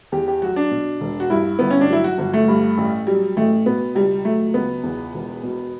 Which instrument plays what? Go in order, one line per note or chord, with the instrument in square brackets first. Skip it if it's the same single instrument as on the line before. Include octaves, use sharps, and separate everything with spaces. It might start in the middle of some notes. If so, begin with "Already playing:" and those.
[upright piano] E2 G4
G4
F#3 F#4
D4
B2
E1
F#4
G2 E4
G1 B3
C#4
D4
F#3 E4
F#4
G1 F#4
A3
G2
A1
F#3 G3
A1 A3
B2 B3
C#2 G3
F#3 A3
C#2 B3
E2
E1
B2